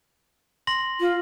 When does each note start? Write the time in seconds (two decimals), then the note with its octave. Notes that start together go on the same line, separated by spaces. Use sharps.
0.67 C6 A#6 F#7
1.00 F4